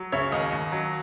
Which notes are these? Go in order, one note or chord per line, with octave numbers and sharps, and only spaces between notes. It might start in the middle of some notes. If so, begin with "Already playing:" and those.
Already playing: F#3
C#3 C#5 E5
D#2 D#5
D#2
F#3